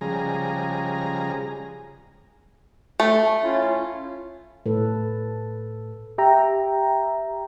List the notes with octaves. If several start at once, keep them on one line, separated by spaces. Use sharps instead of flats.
C#3 F3 G3 G#3 G#4 A#5
A3
C#4 E4 F4
A2 A4 B4
G4 E5 G5 A#5